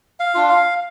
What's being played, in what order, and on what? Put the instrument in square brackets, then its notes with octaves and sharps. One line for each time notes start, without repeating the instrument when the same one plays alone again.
[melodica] F5
D4 F4
F5